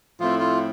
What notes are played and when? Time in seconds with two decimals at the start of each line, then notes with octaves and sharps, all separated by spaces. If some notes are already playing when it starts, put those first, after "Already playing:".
0.20 A2 F3 A3 C4 E4 F4
0.39 F4